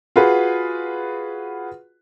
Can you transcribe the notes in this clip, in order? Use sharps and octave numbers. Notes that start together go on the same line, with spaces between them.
F4 F#4 G#4 B4